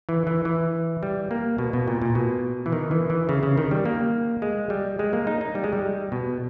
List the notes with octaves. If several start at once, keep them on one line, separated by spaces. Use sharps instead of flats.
E3
E3
E3
G3
A#3
B2
B2
A#2
A#2
B2
E3
D#3
E3
E3
C#3
C#3
D#3
G3
A#3
G#3
G3
G#3
A#3
D#4
D#4
G3
G#3
G3
B2